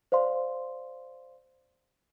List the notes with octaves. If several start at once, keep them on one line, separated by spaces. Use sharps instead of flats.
C5 D5 F5 C6